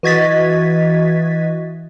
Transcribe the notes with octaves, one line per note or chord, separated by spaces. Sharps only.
E3 F#4 D#5 G#6 A6 B6